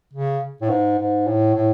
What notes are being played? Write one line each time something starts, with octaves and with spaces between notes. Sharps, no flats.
C#3
A2
G#2
G#2
A2
A2